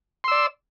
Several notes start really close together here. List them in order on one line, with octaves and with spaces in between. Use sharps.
C6 E6 D5